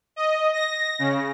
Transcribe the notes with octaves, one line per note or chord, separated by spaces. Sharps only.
D#5
A#6
C#3